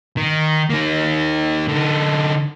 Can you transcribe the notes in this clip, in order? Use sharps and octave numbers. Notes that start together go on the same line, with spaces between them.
D#3
A#3 D#4
D3 D#4